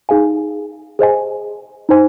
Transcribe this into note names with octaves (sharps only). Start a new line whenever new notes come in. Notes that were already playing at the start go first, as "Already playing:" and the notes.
D#4 G#4 F5 G#5
G#4 C5 D#5 G#5
D#4 C5 G#5